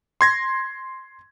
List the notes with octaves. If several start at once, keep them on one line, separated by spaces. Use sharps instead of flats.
C6 G#6 A#6